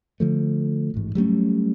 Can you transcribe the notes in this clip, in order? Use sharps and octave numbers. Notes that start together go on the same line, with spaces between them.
D3 F3 A3
A1 G#2
F#3 G3 A3 C#4